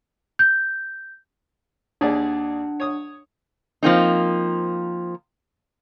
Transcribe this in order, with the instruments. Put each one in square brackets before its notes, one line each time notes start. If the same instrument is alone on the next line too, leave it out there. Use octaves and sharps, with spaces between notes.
[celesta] G6
[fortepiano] D#2 G#4 D5 [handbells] D4 F#5
[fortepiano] C#5 D#6
[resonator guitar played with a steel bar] F3 A#3 C4 D#4